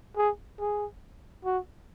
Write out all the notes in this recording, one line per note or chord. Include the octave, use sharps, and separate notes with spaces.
G#4
G#4
F#4